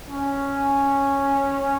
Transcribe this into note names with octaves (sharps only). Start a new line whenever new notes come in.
C#4